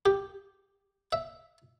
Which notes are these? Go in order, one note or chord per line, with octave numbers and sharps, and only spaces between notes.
G4
E5